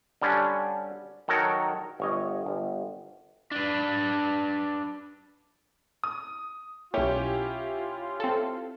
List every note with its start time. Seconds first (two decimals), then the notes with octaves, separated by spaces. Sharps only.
0.22 D3 G3 C#4 D4
1.28 D#3 F#3 F#4 A4 A#4 C#5
2.00 G1 C#5 D#5
2.46 G1
3.51 D4 B4
6.04 D#6
6.94 B1 C#4 E4 F4 G4 C#5
8.20 C4 A4